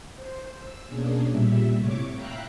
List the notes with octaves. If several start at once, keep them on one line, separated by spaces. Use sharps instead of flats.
C5
E6
B2 A#3 C#4 D4 G#4
A#2 G3 E5
A2 C3 C#5 C#6 D6
E5 F5 G5 A#5 B5 F#6